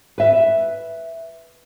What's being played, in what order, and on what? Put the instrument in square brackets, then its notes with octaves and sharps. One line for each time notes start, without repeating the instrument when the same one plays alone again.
[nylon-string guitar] B4 E5